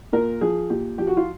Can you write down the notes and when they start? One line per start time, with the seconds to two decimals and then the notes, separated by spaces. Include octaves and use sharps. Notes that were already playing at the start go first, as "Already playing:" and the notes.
0.13 A#2 A#4
0.41 F3 G#4
0.70 A#2 G4
0.98 F3 G4
1.07 F#4
1.17 F4